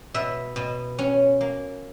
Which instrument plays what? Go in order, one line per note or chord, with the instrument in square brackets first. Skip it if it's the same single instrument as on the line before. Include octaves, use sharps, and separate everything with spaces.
[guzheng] B2 E5
B2
C#4
A#3